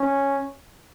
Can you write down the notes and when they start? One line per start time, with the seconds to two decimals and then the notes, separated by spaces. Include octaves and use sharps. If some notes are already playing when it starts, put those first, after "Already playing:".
Already playing: C#4